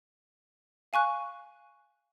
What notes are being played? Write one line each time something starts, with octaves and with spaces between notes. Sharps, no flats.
F5 G#5 C#6 F#6